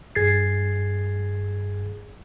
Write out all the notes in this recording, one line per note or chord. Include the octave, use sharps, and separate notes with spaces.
G2 G#4 G#6 A6 C7